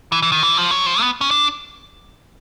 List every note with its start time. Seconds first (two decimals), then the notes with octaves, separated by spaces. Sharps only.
0.12 E3
0.22 E3
0.32 D#3
0.43 E3
0.57 F3
0.71 F#3
0.86 F3
1.01 B3
1.21 C#4
1.31 D4